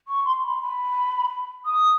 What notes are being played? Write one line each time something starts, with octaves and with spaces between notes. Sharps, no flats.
C#6
C6
B5
B5
D#6